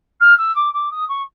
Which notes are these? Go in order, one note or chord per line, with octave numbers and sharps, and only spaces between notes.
F6
E6
D6
D6
D#6
C#6